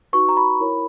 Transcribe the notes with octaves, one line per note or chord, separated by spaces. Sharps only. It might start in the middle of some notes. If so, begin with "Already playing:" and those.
D#4 F#4 B4 C#6
A#5
B5
E4 A#4 C#5